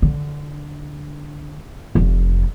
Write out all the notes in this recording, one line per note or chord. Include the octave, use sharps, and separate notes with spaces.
D3
F1